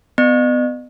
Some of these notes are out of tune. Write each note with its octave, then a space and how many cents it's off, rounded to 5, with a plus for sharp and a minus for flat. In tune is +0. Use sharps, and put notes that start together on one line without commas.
B3 +30 D#5 -45